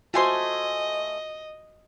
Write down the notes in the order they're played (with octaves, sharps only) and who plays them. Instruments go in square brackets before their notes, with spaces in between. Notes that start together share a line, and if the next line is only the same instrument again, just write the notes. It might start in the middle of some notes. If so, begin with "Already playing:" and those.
[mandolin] A3 G#5 C6 [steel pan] F4 F#4 C5 [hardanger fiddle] D#5